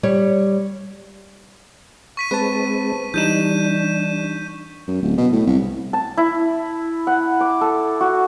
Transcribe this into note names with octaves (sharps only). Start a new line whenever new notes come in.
G3 C#5
C#6 B6 D#7
G#3 C4 B4 A5
E3 G3 D4 D#4 G6 D#7 E7
F#2
D1
B2
A2
C2
A5
E4
F#5
D6
A4
F#4